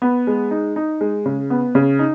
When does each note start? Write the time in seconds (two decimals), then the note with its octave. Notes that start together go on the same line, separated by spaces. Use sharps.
0.02 B3
0.27 G#3
0.51 D#4
0.76 D#4
1.01 G#3
1.26 C#3
1.50 B3
1.75 C#3
1.99 D#4